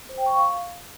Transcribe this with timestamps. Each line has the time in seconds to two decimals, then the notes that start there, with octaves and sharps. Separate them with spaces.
0.09 C5
0.18 G5
0.26 C#6
0.35 F5